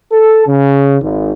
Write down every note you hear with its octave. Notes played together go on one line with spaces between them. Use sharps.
A4
C#3
G#1